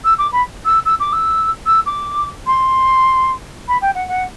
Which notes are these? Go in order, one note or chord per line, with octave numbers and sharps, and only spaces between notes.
E6
D6
B5
E6
E6
D6
E6
E6
D6
C6
B5
G5
F#5
F#5